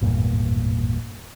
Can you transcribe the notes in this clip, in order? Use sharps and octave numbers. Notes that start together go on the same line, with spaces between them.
G#1 E2 G2 A#2